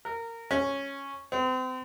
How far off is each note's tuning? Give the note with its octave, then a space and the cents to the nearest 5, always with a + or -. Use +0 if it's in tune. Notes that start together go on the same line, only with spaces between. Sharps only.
A#4 -20
C#4 -5
C4 -35